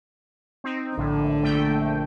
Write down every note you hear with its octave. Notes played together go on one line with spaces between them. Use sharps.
C4 D#4
A#1 A2 D3
A#1 A3 G5